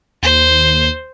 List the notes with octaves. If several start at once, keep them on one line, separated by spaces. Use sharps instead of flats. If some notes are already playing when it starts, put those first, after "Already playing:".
D#2 C5